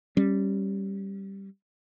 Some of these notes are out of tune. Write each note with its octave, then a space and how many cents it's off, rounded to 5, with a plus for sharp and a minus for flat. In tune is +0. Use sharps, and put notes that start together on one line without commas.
G3 +0 C#4 -20